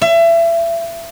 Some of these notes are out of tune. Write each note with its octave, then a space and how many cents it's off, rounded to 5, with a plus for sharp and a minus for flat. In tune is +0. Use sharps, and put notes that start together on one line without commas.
E5 +30